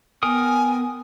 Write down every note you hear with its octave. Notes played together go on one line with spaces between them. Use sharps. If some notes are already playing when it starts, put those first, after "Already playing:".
B3 A#4 G5 G#5 D#6